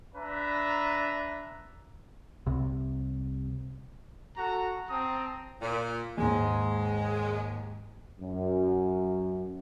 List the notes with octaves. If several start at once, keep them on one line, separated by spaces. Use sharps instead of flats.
D4 B4 E5 A#5
C2 C3
F#4 A4 F#5 A#5
C4 A5 A#5 D#6
A#2
D#2 G#2 G#3
F#2